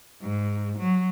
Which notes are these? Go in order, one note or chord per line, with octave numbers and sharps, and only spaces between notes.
G#2
F#3